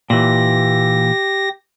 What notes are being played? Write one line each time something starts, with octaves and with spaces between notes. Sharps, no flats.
A#2 E3 G4 A#6